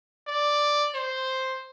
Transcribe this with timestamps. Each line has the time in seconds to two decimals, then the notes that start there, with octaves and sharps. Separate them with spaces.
0.28 D5
0.94 C5